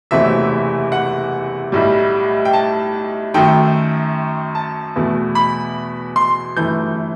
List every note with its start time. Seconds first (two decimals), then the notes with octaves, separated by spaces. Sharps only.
0.11 F#1 E2 C3 F#3 A3 E5
0.92 F#5
1.72 B1 A2 G3
2.45 G5
2.53 A5
3.34 F#2 D#3 A3 G5
4.55 A5
4.96 E2 B2 A3
5.35 B5
6.16 C6
6.57 G1 F#2 E3 A3 G6